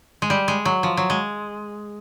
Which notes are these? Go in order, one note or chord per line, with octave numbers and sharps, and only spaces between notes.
G#3
G3
G#3
F#3
F3
F#3
G#3